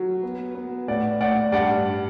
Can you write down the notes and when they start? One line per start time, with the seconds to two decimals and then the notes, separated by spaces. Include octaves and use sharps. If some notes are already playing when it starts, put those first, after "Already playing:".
Already playing: F#3
0.23 B3
0.55 B3
0.88 A2 D5 F#5
1.20 A2 D5 F#5
1.52 G2 D5 F#5